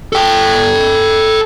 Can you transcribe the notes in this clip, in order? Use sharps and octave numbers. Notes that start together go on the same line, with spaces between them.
A4 G5